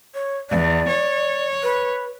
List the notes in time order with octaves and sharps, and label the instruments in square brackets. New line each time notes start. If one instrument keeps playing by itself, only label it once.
[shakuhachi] C#5
[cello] E2 [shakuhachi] D5
[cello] C#5
[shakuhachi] B4